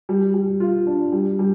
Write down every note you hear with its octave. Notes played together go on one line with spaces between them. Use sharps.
G3
G3
F4
D4
G3
G3